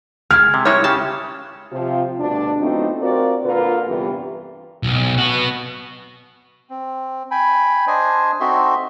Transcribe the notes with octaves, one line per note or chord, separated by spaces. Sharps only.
G#3 F6 G#6
C3
G3 G#3 E4 C#5
C#3 G4 A5
C3 F3
D2 B2 G3 D4
F#3 A3 B3 C4 D#4 F4
C4 F4 F#4 A#4 C5 D5
A#2 D3 F4 A#4 B4
E2 G2 C3 E3 B3 G4
B1
B3 F#4
C4
G5 G#5 B5
D4 C5 D#5 G#5
C4 D#4 F#4 A4 E5 C6